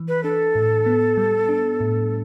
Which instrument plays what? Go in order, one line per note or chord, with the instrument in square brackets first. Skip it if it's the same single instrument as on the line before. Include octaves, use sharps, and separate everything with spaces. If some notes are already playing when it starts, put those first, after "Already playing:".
Already playing: [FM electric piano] E3
[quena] B4
[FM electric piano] D4 [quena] A4
[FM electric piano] A2
B3
G3
D4
A2